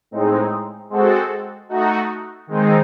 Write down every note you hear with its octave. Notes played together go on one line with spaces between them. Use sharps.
A2 G#3 C4 D#4
G#3 C4 F#4 A4
A3 D#4 F#4
D#3 G#3 C4 D#4